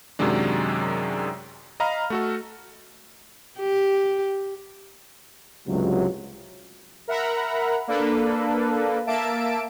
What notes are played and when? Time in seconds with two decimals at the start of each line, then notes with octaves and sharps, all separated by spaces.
0.19 F#2 C3 D#3 F#3 G#3 D4
1.80 D#5 F5 A#5 B5 F6
2.10 A3 F#4 A4
3.60 G4
5.67 C#2 G2 C3 F#3
7.08 A#4 E5 F#5 A#5 B5
7.88 A#3 D4 A4 B4
9.07 A#3 E5 A5 E6 D7